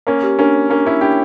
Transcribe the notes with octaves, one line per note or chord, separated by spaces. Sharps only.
A#3 C#4 C#5
G4
A#3 C#4 D4
C#5
A#3 C#4 D4
C#4 E4 C#5
D4 E4 G4